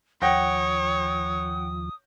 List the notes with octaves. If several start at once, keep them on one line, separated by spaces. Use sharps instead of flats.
D#2 F3 C#5 F#5 G5 D#6 A#6